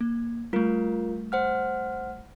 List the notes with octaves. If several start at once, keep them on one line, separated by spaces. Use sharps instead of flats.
A#3
G3 A3 F4 A#4
C5 F#5 F6